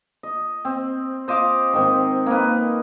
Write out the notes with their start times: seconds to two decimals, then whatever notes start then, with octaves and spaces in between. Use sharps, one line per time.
0.23 D#5
0.65 C4
1.28 C5 D#5 F5 D6
1.73 G#2 D#3 C4
2.26 A#3 D#4 B4